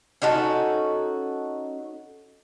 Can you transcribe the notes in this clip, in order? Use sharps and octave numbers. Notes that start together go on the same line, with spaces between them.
C#4 D#4 F#4 A4